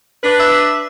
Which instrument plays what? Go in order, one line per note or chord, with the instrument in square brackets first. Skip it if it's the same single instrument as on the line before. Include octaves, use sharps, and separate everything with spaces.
[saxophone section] D4 B4
[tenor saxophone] E5